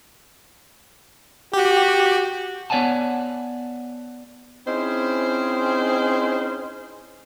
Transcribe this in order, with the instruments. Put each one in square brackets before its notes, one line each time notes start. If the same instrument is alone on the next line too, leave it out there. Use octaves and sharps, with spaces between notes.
[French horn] F#4 [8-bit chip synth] G4
[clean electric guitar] B3 C#5 D5 F#5 G#5 A5
[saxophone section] C4 C#4 D#4 E4 G#4 C5